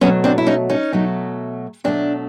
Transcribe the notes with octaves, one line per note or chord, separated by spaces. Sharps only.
B2 F#3 A3 B3 C#4
C4 D4
E4
C#4 D#4
C#4 D#4
B2 F#3 A3
B2 F#3 A3 C4 D4